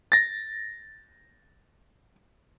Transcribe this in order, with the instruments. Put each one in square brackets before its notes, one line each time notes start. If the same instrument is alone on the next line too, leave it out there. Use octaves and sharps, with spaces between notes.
[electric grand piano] A6 A#6